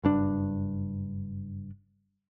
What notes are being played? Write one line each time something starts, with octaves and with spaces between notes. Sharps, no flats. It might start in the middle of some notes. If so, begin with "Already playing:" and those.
F#1 G2 D4